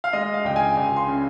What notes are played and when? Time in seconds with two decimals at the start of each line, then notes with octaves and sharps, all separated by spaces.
0.04 F5
0.13 G#3 D#5
0.34 F5
0.45 C#2 G5
0.56 G#5
0.77 C#2 G#5
0.97 C6
1.08 C#3